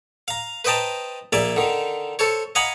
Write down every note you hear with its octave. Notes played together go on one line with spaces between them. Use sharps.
F5 A#5
B4 C5 D#5 G5 A5 A#5
A#1 A#3 D5 E5 G#5
D3 D#3
A4 C5 C#5
D#5 F5 F#5 G#5 A#5 B5